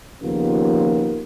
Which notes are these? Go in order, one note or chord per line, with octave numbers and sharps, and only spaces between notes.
D#2 C#3 F3 B3 F4 A#4